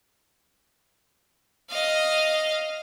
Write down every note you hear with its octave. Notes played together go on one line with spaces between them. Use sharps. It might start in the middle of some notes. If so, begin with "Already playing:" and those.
D#5 F5